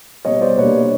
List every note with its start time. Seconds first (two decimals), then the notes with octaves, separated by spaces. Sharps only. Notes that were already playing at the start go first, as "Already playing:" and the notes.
0.25 B2 G3 B3 C#5 D#5
0.41 C5 D5
0.57 B2 G3 A#3 D4 B4 C#5